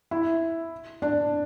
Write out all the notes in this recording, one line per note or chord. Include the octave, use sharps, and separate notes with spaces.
E4
D4